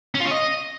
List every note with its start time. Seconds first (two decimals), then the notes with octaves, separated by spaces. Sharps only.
0.15 C#4
0.20 F4
0.26 C#4
0.31 D#5